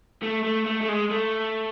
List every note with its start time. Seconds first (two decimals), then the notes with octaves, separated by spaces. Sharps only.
0.22 A3
0.44 A3
0.66 A3
0.81 A3
0.89 G#3
1.11 A3